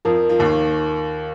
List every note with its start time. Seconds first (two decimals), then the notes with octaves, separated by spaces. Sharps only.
0.05 F2 F3 A#4
0.29 F3
0.39 D#2 D#3 F5